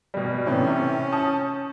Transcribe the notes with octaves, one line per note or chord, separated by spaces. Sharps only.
B2 G3
A2 C3 E3 C#4
A5 D#6 G6